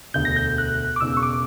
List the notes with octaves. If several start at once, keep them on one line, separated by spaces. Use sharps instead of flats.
E1 D2 D3 G6
A#6
G6
F#6
D6
E1 E2 C#3 E6
C#6
D6